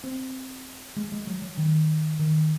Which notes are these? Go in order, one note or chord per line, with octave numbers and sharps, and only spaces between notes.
C4
G#3
G#3
F#3
F#3
D#3
D#3